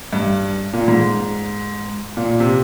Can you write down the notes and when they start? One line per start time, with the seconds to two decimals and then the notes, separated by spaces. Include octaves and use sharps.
0.13 G2
0.73 A#2
0.88 G#2
2.17 A#2
2.40 C3